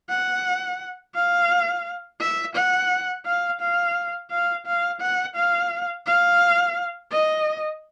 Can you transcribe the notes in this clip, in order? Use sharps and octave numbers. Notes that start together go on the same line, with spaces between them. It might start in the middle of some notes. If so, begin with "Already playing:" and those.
F#5
F5
E5
F#5
F5
F5
F5
F5
F#5
F5
F5
D#5